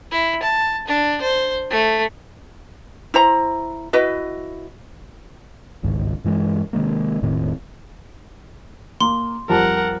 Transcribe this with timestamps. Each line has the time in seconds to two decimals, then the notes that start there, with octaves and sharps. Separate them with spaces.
0.11 E4
0.43 A5
0.88 D4
1.22 C5
1.70 A3
3.14 E4 C5 A#5
3.93 E4 F#4 B4 D#5
5.83 G1 C#2 G#2 D#3
6.24 G2 E3 G#3
6.73 C3 D#3 G#3 A#3
7.22 E1 A2 D#3 C4
9.00 A#3 C6
9.49 F2 G3 A#4 F#5 A5